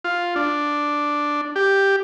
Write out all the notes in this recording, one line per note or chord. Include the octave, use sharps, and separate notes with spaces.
F4
D4
G4